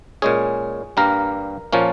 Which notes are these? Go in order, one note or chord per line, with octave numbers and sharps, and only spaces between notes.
A#2 G#3 C#4 G#4
G2 G3 A#3 A#4
A#2 F3 A#3 C#4